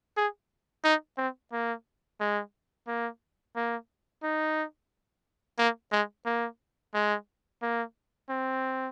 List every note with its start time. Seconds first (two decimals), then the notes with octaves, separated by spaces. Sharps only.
0.17 G#4
0.84 D#4
1.17 C4
1.52 A#3
2.20 G#3
2.87 A#3
3.56 A#3
4.23 D#4
5.58 A#3
5.92 G#3
6.26 A#3
6.94 G#3
7.62 A#3
8.29 C4